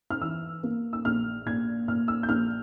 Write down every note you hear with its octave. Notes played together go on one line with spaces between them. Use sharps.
F6
E3 E6
A#3
E6
A#1 F6
A#2 G#6
A#2 F6
E6
G6
A#1 F6